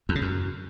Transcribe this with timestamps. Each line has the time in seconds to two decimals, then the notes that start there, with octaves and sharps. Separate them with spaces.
0.09 E2
0.15 C#3
0.22 F#2